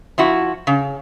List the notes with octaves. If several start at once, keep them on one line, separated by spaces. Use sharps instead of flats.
F3 E4 F#4
C#3